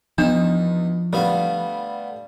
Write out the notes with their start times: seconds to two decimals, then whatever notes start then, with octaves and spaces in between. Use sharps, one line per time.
0.18 E2 F3 D4 D#4
1.13 D3 G3 A3 B3 F5